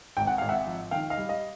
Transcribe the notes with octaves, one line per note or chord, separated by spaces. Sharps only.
G#1 G5
F#5
G#1 F5
E5 F#5
F3
D#3 F5 G5
D#5 F5
G3
D#5 F5